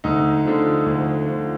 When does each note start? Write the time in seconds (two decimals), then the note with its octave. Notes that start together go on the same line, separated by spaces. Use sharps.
0.04 D2 D#4
0.45 D3 F3
0.86 D2
1.26 D3 F3